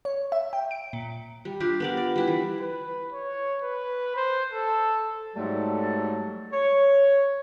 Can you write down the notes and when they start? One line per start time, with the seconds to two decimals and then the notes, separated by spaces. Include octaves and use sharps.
0.05 C#5
0.32 E5
0.53 G5
0.71 D7
0.93 A#2
1.45 G3
1.60 D4 F4 G4
1.80 B3 A#4 D5
1.97 D5
2.16 G3 E4 B4
2.27 E3
2.61 B4
3.12 C#5
3.62 B4
4.16 C5
4.53 A4
5.36 G#2 F#3 G3 A3 A4 A5
6.53 C#5